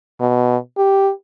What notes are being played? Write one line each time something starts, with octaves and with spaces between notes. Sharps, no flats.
B2
G4